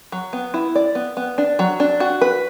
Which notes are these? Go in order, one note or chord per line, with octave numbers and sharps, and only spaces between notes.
F#3
B3
E4
D5
B3
B3
D4
F#3
D4
F#4
B4